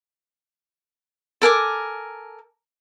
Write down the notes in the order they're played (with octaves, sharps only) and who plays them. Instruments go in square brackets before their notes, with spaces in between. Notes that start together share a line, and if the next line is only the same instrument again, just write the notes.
[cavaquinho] A4 A#4 G#5 D6